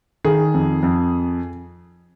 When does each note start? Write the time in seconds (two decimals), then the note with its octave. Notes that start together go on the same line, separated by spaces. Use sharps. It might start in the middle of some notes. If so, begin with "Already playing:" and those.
0.25 D#3 G#4
0.54 F2
0.83 F2